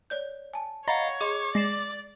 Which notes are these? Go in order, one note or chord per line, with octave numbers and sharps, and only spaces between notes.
C#5 D5 G6
G#5 A5
C#5 D#5 F5 F#5 A#5 B5 A6
G#4 D#5 C6 D6
G#3 D5 A#6 C7 E7